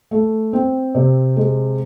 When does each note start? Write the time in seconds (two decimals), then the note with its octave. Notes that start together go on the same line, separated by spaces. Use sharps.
0.11 A3
0.53 C4
0.95 C3
1.37 G#3